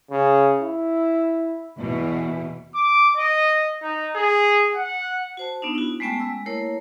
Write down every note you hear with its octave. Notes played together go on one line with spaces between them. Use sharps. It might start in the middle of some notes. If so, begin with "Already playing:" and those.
C#3
E4
E2 B2 E3
D6
D#5
D#4
G#4
F#5
F#4 C5 A5
B3 D4 D#4
E4 F#4
G#3 A3 B3 C#4 G5 A5
G#3 E6
A3 A#3 E4 A#4 C#5